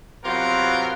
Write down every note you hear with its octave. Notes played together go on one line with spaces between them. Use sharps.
C3 F#3 B3 F4 A#4 B4